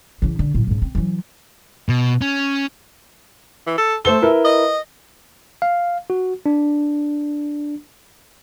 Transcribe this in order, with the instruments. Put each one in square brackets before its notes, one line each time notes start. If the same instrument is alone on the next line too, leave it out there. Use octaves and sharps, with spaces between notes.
[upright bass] C#3 E3
D3
A2 F#3
G#2 C#3
C4
E3 F#3
[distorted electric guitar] B2
C#4
[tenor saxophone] E3
A4
[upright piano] A3 C5 G7 [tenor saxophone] A4
[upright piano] E4 A#4 B4
[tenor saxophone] D#5
[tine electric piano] F5
F#4
D4